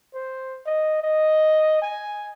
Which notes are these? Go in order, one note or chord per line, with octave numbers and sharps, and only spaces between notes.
C5
D#5
D#5
G#5